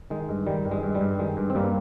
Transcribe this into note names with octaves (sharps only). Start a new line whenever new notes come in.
D#3 G#3
G2
D#3 G3
G2
G#3
G2
G3
G2
D#3 G#3
G2
C4
G2 G3 A#3